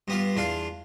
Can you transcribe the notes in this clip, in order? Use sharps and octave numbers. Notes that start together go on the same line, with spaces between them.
G2 B3 F4
E2 D4 F4 F5